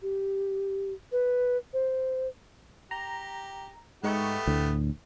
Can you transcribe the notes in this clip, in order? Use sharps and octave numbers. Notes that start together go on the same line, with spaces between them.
G4
B4
C5
G4 A#5
G#2 A3 B3 D#4 G4 C#6
D2 A2